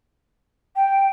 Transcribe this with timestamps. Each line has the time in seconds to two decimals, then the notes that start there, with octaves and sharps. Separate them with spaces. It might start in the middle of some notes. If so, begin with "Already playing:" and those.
0.76 G5